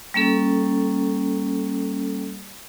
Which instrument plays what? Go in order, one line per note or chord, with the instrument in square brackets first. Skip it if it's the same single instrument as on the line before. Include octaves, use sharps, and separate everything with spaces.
[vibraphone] G3 A#3 C#4 A4